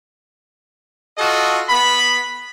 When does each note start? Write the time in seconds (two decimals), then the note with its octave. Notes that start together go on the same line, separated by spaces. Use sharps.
1.18 F4 F#4 A4 D#5
1.69 B3 B5